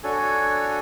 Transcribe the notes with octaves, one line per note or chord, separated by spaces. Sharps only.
D4 F#4 A4 C#5 G#5